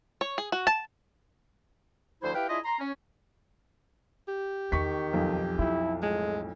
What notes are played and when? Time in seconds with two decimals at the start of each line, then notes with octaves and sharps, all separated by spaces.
0.21 C#5
0.38 G#4
0.52 F#4
0.67 A5
2.22 D2 F3 E4 C5
2.35 E4 G4 B4 F5 G5
2.49 D4 E4 F4 G#4 D#5 E5
2.65 A#5 C6
2.80 C#4
4.28 G4
4.72 E2 D#3 C#6 B6
5.13 B1 F2
5.59 E4 F4
6.03 A2 G#3